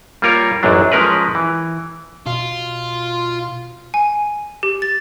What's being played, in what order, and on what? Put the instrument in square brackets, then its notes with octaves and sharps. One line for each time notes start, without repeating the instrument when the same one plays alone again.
[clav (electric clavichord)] G3 A#3 F4 A#4 C#5
A1 F#2 F#3 D4
F3 G#3 C#4 A#4 B4
E3
[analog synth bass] B2 [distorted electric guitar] F4
[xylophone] G#5
G4
A6